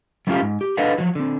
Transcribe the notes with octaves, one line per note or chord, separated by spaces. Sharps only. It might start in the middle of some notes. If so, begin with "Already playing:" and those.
F#3 A3 C#4 F4 G4 F5
G#2
G4
D4 A4 B4 D#5 F5 F#5
F3 F#3
D3 C4